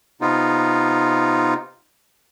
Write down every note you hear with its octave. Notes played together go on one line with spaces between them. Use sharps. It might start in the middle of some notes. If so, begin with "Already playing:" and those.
C3 B3 D#4 F4